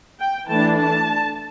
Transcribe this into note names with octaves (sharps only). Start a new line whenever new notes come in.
G5
E3 A3 D4 A5
A5